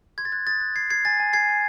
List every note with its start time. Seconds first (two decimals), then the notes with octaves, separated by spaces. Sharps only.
0.18 C6 G#6
0.25 A6
0.32 F#6 G#6
0.46 D#6 A6
0.61 F#6
0.75 F#6 G#6 C7
0.90 F#6 G#6 C7
1.05 G#5 A6
1.20 G#5
1.33 G#5 G#6 C7
1.48 G#5